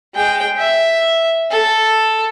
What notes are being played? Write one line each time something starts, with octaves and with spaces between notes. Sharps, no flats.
G#3 G5
E5
A4